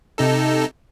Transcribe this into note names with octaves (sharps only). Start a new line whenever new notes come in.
C3 D#4 A4